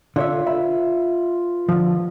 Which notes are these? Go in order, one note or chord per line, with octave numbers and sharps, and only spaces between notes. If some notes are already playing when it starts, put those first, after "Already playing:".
D3 F4 C#5 E5
B4 E5
D3 F3